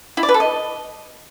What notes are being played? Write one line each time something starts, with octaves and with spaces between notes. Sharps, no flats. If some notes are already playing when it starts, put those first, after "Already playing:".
E4
D5
B4
A4
D#5